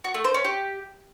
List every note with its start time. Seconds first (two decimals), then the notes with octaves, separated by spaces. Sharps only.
0.04 F#4
0.14 A3
0.24 C5
0.34 C#4
0.44 G4